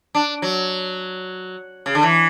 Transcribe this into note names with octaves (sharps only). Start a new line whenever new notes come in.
D4
F#3
C#3
D3
E3